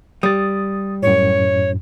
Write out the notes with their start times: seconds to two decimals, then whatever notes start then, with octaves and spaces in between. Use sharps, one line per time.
0.23 G3 D#6 A6
1.02 F#2 A2 C#5